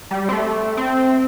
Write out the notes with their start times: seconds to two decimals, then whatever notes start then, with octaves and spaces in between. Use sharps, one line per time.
0.11 G3
0.29 C4
0.33 A3
0.77 C4